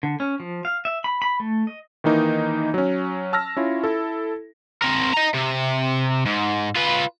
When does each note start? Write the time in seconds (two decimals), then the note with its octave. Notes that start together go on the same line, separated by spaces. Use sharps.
0.03 D3
0.20 C#4
0.40 F3
0.65 F5
0.85 E5
1.04 B5
1.22 B5
1.40 A3
1.67 D#5
2.04 D#3 E3 A#3 D#4
2.74 F#3 C#4
3.33 A5 E6 F6 A#6
3.57 C#4 E4 F4
3.84 E4 A4
4.82 C4 A#4
5.14 D#5 A#5
5.34 C3
6.26 G#2
6.75 F4 B4